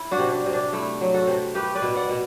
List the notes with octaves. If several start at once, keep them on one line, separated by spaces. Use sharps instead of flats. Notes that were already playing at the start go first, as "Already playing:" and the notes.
Already playing: E4
D4 F#4
C3
D4
C3
D4
A3 E4
F#3
F#4 A4
C3
A3 G4 B4
B4 D5
B2
D5 F#5
B2